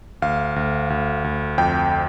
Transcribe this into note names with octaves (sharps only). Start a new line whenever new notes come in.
D2 F5
D2
D2
D2
F2 G5